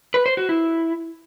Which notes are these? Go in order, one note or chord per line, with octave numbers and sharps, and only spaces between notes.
B4
C5
F#4
E4